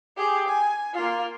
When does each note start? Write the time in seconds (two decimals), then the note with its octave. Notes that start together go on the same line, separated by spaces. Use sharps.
0.17 G4 G#4
0.48 G#5
0.94 A#3 F4